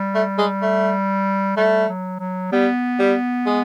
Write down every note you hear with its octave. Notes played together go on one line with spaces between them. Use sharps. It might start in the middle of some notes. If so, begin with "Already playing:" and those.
Already playing: G3
A3
G#3
A3
G3 A3
F#3
F#3
G3 B3
G3
G#3